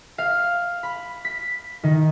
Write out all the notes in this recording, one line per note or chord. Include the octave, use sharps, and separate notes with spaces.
F5
B5
B6
D#3